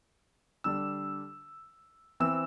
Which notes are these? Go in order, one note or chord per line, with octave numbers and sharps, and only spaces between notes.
D3 G3 D4 E6
E3 C4 E6